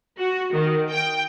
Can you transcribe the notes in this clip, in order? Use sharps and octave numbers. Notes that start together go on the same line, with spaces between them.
F#4
D#3
G5